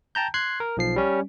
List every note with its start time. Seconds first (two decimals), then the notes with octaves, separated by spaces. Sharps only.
0.15 G5 A5 A#5 G6
0.34 C6 F#6 G#6 C7
0.60 A#4
0.77 B1 F3 C7
0.96 G3 C#4